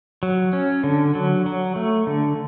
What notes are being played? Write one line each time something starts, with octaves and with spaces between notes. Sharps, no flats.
F#3
C#4
D3
F#3
F#3
A3
D3